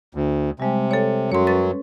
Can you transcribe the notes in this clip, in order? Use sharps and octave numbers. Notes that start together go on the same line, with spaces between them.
D2
C3 G3 G#3
A4 C#5
F#2 F#3 C#5 C6
C#4 B4 A6